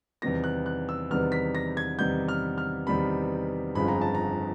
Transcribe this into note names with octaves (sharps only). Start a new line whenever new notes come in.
E2 C3 D#3 G3 B3 A#6
F#6
F#6
E6
E2 C3 D#3 G3 B3 F6
B6
A#6
G#6
E2 C3 D#3 G3 B3 G6
F6
F6
E2 C3 D#3 G3 B3 B5
G1 F2 C#3 F3 G#3 B5
A#5
A5
A#5